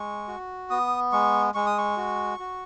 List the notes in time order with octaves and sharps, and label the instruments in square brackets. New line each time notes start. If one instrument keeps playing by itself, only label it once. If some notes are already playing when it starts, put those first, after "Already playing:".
Already playing: [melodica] G#3 C#6
F#4
B3 D#6
G#3 C#6
G#3 C#6
D#6
C#6
F#4
F#4